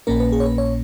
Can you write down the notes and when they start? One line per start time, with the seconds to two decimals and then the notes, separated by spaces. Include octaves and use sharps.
0.07 A#1 A#2 A#3 C#4 A#4
0.20 B4
0.32 G#4
0.40 C#5
0.46 B4
0.58 C#5